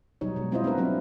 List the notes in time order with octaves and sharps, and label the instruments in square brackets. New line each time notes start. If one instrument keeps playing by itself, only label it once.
[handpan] B2 F#3 G3 D#4 C#5
B2 G#3
G3 C4 E4 F4 C5 D#5
B3 C4 D4 F#4 A#4 B4
F#3 A#3 C4 D4